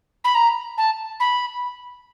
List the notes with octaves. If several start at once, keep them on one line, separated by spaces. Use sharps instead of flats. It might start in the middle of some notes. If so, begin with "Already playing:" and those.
B5
A#5
A5
B5